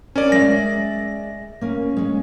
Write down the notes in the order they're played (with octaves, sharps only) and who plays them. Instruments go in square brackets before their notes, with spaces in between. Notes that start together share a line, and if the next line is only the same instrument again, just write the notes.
[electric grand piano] C#4 D5 [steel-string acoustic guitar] A#4
[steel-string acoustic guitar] G#3 D5 E5 [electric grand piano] A#6
[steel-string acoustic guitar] A#3 C#4
G#3 C#4